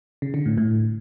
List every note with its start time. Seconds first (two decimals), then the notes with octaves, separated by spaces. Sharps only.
0.22 C#3
0.34 D3
0.46 A2
0.57 A2